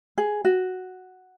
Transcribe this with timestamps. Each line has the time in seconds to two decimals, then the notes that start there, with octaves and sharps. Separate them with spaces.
0.18 G#4
0.45 F#4